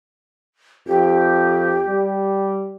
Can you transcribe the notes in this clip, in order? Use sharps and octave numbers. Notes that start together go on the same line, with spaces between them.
F2 G4
G3